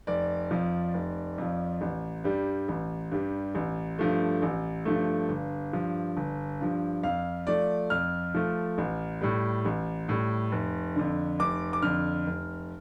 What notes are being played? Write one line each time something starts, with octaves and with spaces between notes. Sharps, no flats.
F1 D5
F2 F3
F1
F2 F3
A1
G2 G3
A1
G2 G3
A1
G2 F3 A3
A1
G2 F3 A3
G1
G2 F3
G1
G2 F3
F2 F5
F3 A3 D5
F2 F6
F3 A3
A1
A2 G3
A1
A2 G3
F1
F2 D3
F1 D6
D6
F2 D3 F6
F1